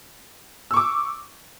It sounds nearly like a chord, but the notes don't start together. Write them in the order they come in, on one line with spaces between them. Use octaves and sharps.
E6 C#6 D6